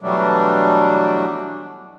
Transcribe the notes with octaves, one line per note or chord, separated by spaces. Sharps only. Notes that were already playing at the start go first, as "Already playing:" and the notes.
B2 E3 F#3 G3 A3 D4